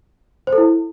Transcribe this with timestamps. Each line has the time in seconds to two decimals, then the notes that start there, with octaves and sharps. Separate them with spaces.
0.47 C5
0.53 A4
0.58 E4